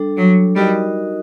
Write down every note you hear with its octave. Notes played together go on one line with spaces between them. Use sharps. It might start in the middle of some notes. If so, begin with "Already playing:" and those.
Already playing: G3 D4 A4
F#3
G3 D#4 F#4 A#4 D#5